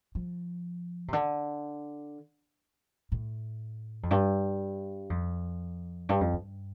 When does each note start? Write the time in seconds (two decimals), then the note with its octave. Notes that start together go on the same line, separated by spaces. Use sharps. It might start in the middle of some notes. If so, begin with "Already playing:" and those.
0.15 F3
1.08 C3
1.13 D3
3.12 A2
4.03 F2
4.11 G2
5.10 F2
6.09 G2
6.21 F2
6.33 G2